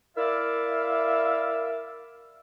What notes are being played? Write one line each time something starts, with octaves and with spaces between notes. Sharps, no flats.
E4 A#4 D5 E5 F5